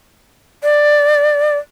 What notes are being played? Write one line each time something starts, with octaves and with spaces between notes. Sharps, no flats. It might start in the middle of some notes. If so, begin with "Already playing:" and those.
D5